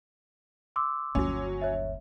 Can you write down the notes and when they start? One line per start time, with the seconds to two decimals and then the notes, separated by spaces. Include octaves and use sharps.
0.76 C6 D6 E6
1.15 G1 D#2 F#3 C#4
1.62 C#5 E5